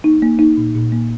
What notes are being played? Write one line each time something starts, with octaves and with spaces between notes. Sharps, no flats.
A#3 D#4
A#3
A#3 D#4
A#2
A#2
A#3